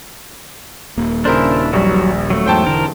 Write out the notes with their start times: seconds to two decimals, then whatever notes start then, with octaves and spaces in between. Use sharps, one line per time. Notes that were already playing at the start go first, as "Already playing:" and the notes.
0.98 D#1 A#3
1.25 C#3 D4 E4 A#4 C5
1.73 A#1 F#3 G3
2.30 F#3 A3
2.46 E2 G#2 C5 G5 A5
2.67 E1 D3 E3 A#4